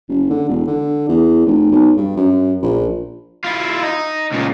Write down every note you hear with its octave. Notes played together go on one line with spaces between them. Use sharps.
F#1
D3
E1
D3
E2
F1
B1
G2
F#2
A#1
E4 F4
D#4
C#2 A#2